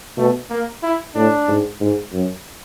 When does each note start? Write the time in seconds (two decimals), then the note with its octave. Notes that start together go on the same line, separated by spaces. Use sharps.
0.18 B2 A3
0.50 A#3
0.83 E4
1.15 A2 D4
1.48 G#2
1.81 G#2
2.13 F#2